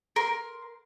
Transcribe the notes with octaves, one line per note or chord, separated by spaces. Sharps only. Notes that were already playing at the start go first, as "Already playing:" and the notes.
A#4 C6